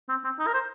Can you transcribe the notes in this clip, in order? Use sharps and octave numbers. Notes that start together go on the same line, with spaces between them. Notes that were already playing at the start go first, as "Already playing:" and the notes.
C4
C4
D#4
A#4
C5